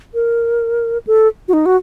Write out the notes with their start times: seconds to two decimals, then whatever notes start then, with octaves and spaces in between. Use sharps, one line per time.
0.14 A#4
1.07 A4
1.48 F#4
1.53 D#4
1.66 F#4